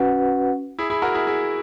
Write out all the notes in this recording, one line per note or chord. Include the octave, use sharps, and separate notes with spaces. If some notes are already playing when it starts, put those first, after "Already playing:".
Already playing: C#4 F#4 B4 F#5
E4 G#4
E4 G#4
F#4 A#4
E4 G#4
E4 G#4